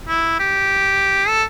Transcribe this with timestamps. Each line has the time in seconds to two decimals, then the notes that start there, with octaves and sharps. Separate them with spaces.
0.09 E4
0.39 G4
1.28 A4